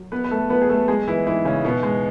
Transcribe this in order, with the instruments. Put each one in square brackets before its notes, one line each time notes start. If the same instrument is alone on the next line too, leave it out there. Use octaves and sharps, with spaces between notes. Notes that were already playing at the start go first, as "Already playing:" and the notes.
Already playing: [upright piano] F#3
E2 B3 B4
B4
A3 A4
F#3 B3 B4
G#4
A3 A4
F#3 G#3 G#4
E3 E4
G#2 E3 E4
C#3 C#4
B2 E3 B3
G#3